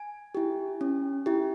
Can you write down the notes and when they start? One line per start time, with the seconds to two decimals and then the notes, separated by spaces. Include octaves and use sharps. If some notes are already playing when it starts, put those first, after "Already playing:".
Already playing: G#5
0.35 E4 G4
0.81 C#4
1.26 E4 G4